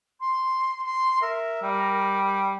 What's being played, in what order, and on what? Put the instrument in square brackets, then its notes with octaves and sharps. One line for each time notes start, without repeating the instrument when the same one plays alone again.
[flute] C6
C6
[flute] A#4 [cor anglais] E5
[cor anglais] G3